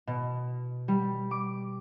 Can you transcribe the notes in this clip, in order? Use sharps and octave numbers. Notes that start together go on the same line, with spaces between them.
B2
G3
D6